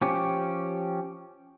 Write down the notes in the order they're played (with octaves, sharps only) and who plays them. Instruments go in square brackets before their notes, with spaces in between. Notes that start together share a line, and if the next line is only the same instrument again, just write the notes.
[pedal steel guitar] F3 C#4 G4